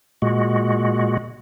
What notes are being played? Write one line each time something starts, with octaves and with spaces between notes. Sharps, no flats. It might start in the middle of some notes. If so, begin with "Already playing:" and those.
A#2 G#3 F#4